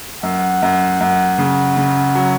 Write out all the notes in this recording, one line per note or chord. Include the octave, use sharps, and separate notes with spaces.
F#2 F#5
F#2
F#2
C#3
C#3
F#3